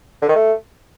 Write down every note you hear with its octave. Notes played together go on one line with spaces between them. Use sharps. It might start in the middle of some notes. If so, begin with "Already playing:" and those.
D3
D#3
A3